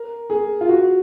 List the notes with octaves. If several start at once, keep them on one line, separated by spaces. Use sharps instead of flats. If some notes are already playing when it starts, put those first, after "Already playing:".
Already playing: A#4
G#4
F4
F#4